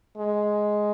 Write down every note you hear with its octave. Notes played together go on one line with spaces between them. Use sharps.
G#3